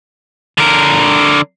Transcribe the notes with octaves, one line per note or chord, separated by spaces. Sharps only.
D3 A#4